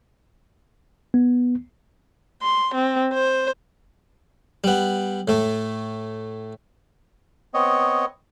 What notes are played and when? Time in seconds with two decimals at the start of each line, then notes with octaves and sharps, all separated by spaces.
1.14 B3
2.42 C6
2.74 C4
3.13 C5
4.64 G3 B3
5.28 A2 A3
7.54 B3 C4 C#5 D#5